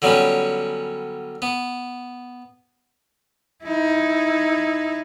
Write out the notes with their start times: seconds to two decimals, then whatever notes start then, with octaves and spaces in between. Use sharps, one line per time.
0.02 D3 F#3 G3 B3 C#4
1.42 B3
3.64 D#4 E4